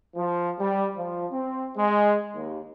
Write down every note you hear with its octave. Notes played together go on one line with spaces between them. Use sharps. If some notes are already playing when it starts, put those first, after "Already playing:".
F3
G3
F3
C4
G#3
D#2